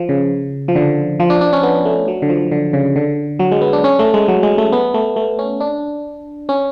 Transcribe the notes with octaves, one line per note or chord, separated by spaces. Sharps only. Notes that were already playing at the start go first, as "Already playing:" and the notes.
Already playing: F3
C#3
F3
D3
F3
D4
D4
C#4
B3
A3
F#3
D3
F3
D3
C#3
D3
F#3
G#3
B3
D4
C#4
A3
G#3
F#3
G#3
A3
B3
A3
A3
C#4
D4
C#4